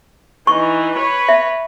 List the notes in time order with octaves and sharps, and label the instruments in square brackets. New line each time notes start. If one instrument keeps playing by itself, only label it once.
[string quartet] E3 D#4 [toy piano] C#6
[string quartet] B4 C#5
[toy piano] E5